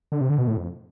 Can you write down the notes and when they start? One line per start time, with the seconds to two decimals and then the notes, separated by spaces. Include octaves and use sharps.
0.12 D3
0.21 C3
0.30 D3
0.38 B2
0.47 A2
0.57 F2